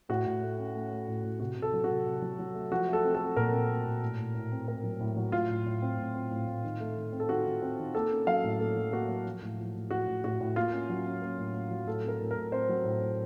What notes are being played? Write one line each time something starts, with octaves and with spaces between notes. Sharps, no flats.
A2 F#4
A2
A3
C#4
A3
A3
A2
A2
C3 F#4
C3
A4
F#3
F#4
C3
C3
F#3
F#3
A3
F3 F#4
A3 A4
C4
A4
C4
A#2 A#4
C4
A3
A#2
A2
A2
A2
C4
A2 A#4
F#3
A2
F#3
A2 F4
A2
A2
C4
A2
C4
A2
A2
D#3
A3
D#3
C4
A4
D#3 F#4
D#3
C4
D#3
A#3 A4
C#4
F#3 F5
A2
A#3 A4
F#3
A#3 F#4
F#3
F3
A2
F3
A2
A2 F#4
A2
A2 F#4
A2
A#3 F4
C#4
F#3
C#4
A#3
A2
A#3
F#3
A2 A4
C4 A#4
A2
A#4
A2
C4 C5
F#3
A2
A2